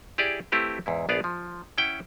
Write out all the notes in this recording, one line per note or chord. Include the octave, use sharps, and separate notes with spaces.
E4 G4 G#4 D5
A3 C4 E4 G4 B4 F5
E2 G#2 E4
A#1 B3 G#4 D5 F5
F3
C#4 E4 F#5 G5